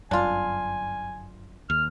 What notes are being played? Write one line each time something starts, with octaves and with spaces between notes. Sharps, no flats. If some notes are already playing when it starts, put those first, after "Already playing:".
G1 F#2 D4 F4 G#5
D#2 F6